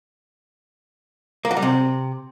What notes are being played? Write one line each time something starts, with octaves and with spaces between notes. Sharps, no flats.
A#3
F#3
G3
C3